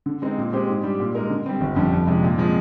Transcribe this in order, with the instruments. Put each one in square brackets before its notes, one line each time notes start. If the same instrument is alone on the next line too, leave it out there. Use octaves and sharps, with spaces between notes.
[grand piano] D3
G#3 C4 D#4
A#2
G#3 C4 G4 C5
G#2
G3 D4 G4
A#2
G#3 D#4 A#4
D3
G3 C4
G1
F2 D3 G3
F2
C3 F3 G#3 D4
A#2
F3 G#3 C4